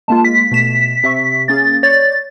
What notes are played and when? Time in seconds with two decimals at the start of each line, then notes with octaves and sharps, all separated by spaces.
0.08 G#3 A#3 F4 A5
0.25 B6
0.51 B2 A3 E7
1.03 C3 E5 C#6
1.48 A#3 C#4 G#4 A6
1.83 C#5 D5 G6 A6